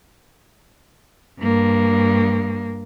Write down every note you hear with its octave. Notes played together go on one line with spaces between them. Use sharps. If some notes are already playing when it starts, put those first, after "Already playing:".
G2 A#3